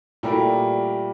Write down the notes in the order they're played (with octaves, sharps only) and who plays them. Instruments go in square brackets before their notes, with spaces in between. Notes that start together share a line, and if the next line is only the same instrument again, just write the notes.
[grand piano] A#2 A3 E4 A#4 [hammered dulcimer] G3